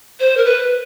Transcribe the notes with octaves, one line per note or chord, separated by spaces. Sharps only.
C5
A#4
B4